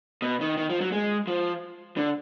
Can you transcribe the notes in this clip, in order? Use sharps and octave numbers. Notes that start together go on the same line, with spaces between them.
B2
D#3
D#3
F3
F#3
G#3
F3
D3